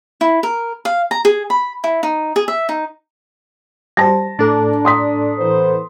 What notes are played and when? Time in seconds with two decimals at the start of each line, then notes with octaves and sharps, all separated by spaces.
0.21 E4
0.43 A#4
0.85 F5
1.11 A#5
1.25 G#4
1.50 B5
1.84 E4
2.03 D#4
2.36 G#4
2.48 E5
2.69 D#4
3.97 G3 C5 A5 A#6
4.39 A2 D4 A4 A#5
4.85 C6 D#6 B6
5.39 E3 B3 C5